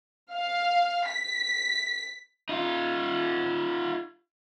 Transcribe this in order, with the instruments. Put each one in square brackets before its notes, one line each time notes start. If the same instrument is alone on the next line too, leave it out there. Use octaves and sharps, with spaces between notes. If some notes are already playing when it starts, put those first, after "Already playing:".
[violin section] F5
B6
[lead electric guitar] D#4 F4